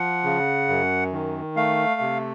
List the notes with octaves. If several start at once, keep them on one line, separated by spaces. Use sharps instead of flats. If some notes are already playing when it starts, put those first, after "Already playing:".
Already playing: F3 F#5
C#3
F#2
D#3
A3 F5
C3